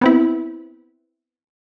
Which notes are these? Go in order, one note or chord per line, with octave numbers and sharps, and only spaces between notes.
B3 C4 E4